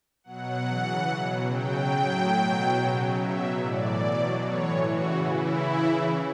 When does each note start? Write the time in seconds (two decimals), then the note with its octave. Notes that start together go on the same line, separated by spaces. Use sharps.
0.24 B2 F#3 F#5
0.65 C#3 E3
1.07 F#3
1.12 B2
1.50 C#3 F#3 G5
1.91 A2 F#3
2.34 B2 F#3
2.76 C#3 F#3
3.17 B2 F#3 E5
3.59 A2 E3 D5
4.02 B2 F#3
4.44 A2 E3 C#5
4.85 C#3 E3 F#4
5.28 C#3 E3 E4
5.69 C#3 E3